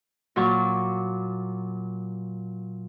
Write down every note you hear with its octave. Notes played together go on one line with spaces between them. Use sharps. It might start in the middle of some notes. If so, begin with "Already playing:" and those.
A#2 F#3 D5 C#6